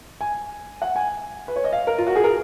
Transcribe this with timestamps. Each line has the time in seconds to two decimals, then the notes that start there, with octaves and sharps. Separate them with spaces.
0.21 G#5
0.82 F#5
0.96 G#5
1.48 B4
1.56 C#5
1.64 D#5
1.73 F5
1.87 A#4
1.98 F4
2.07 F#4
2.16 G#4
2.24 A#4